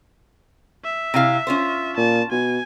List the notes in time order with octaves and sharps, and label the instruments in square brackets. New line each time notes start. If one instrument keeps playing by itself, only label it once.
[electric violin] E5
[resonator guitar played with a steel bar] C3 E4 F5
C#4 F4 C5
[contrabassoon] A#2 [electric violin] A5
[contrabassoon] B2 [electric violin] G#5